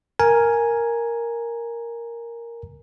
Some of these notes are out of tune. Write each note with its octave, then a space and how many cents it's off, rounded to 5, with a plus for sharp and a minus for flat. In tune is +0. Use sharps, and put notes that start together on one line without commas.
A#4 +0 G#5 +0